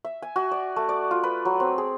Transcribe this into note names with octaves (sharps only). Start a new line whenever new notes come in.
E5
G#5
F#4
D5
A3
D5
F4
B4
F#3
C4
G#4